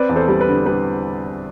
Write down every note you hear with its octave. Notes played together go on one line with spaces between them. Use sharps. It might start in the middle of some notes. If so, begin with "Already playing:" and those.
Already playing: C4 B4 D5
E2
A4 C5
G3
B4
D3
G3 B4